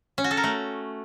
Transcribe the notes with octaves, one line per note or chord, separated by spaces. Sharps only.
C#4
F#4
A4
A#4
A3